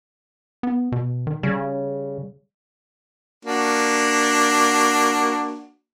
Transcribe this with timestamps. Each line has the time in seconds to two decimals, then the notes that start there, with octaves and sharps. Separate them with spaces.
0.63 B3
0.92 B2
1.27 D#3
1.43 C#3 G3
3.45 A#3 D4 F#4